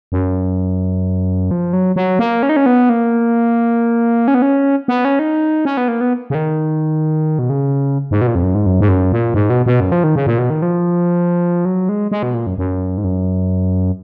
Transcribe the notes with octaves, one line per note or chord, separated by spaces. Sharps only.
F#2
F3
F#3
F#3
A#3
C#4
D#4
C#4
B3
A#3
C#4
B3
C#4
B3
C#4
D#4
C#4
B3
A#3
B3
C#3
D#3
B2
C#3
G#2
B2
A#2
F2
F#2
G#2
F#2
G#2
F#2
A#2
G#2
B2
B2
F#2
F3
D#3
C#3
A#2
B2
D#3
F3
F#3
G#3
G#3
B2
A#2
F#2
F#2
G#2
F#2